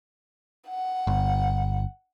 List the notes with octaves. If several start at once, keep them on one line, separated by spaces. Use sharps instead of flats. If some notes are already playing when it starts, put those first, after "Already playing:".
F#5
G1